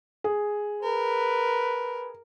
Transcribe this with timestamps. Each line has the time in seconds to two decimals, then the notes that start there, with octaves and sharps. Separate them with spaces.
0.24 G#4
0.83 A#4 B4